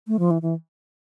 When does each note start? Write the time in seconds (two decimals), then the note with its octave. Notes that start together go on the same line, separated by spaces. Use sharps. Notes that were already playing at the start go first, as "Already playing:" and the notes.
0.08 A3
0.19 F3
0.31 E3
0.42 E3